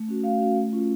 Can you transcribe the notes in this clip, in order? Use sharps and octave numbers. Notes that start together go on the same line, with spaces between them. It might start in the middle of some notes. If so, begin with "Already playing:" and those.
Already playing: A3
C#4 F#4
A3 F5
C#4 F#4
A3
C#4 F4